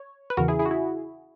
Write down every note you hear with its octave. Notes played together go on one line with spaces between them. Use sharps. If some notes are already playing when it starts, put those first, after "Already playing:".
Already playing: C#5
B4
E2 C#3 E3 F#4 A#4
E4 G#4
E4 G#4
F#4
E4